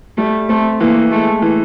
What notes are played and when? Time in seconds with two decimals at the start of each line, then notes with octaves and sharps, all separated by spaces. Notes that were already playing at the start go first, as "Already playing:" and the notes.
0.18 G3 A3
0.49 A3 C4
0.80 E3 A#3
1.11 G#3 A3
1.42 E3